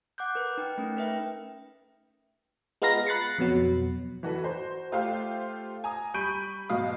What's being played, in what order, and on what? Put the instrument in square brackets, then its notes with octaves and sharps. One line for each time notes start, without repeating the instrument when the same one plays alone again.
[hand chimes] F#5 D6 F#6 G6
A#4 B4
D#4 G5
A3 C#4 D#4
A#4 B4 E5 G5
[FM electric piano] G#3 B3 F4 F5 A#5 A#6
B5 F#6 A6 C7 C#7
F2 B2 F#3
[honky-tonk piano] E3 F#4 A4 B4
F#4 C5
A3 F4 G4 C5 F5
G#5 A#5 D#6
G3 B5 C#6 G6 D7 D#7
G#2 B2 F#3 F5 D#6